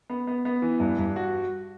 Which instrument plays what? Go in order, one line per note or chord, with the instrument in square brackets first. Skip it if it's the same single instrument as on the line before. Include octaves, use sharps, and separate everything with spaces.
[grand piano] B3
B3
B3
E3
G2
G2
F#4